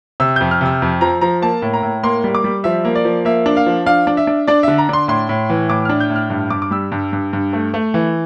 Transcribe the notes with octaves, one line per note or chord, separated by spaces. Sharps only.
C3 E6
F2 G6
F6
C3 E6
F2
F3 A#5
F3 A#5
A#3 A5
A2
A#5
A2
A#3 C6
G3
D6
G3
F3 E5
A#3
D5
F3
A#3 E5
D4
F5
F3
D4 F5
D4
E5
D4
D4 D5
D3 E5
A#5
D4 C6
A2 C6
A2
E3
A2 D6
D4 F6
G6
A2
F6
G2
G2 D6
D6
G3 E6
G2
G2
G2
A3
A3
E3